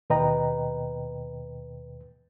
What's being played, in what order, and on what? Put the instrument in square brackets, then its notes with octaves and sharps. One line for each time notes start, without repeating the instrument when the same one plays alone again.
[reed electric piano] D#2 B2 B4 D#5 G5 A#5